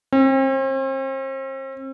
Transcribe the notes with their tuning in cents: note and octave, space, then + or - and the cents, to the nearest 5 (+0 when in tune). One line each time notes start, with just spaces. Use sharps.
C4 +40